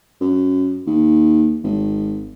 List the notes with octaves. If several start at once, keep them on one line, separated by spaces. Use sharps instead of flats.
F#2
D#2
G#1